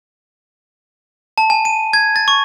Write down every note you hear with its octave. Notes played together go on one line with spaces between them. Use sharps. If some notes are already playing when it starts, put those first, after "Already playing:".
A5
G#5
D#7
G#6
A6
C#6